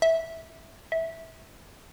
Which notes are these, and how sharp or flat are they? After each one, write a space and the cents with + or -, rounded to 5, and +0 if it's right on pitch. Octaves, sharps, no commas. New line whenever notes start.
E5 -10
E5 -10